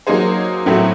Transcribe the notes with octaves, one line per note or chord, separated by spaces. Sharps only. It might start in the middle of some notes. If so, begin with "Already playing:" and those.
F#3 A#3 D#4 G#4 C5
A2 F#3 A3 C4 E4